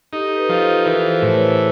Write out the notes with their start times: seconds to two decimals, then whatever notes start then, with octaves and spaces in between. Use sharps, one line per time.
0.13 D#4 G4 A4
0.37 A4 B4
0.49 F3
0.61 A4 B4
0.85 E3 A#4 C5
1.10 A#4 C5
1.22 A2
1.34 B4 C#5